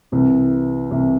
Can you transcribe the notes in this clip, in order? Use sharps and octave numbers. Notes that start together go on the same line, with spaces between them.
C2 C3 E3
C2 C3 E3